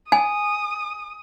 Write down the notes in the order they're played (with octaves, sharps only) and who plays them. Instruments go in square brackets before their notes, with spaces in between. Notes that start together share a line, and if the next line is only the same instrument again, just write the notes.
[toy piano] G#5 [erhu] D#6